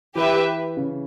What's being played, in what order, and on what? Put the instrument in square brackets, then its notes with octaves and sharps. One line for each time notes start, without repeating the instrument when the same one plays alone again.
[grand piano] E3 [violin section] G4 B4 E5
[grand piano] C#3